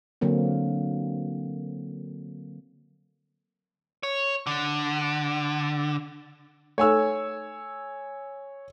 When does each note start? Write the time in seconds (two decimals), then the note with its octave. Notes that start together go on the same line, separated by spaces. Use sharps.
0.21 D3 F#3 A#3 C4
4.03 C#5
4.47 D3
6.78 A3 D#4 A4 C#5 G#5 E6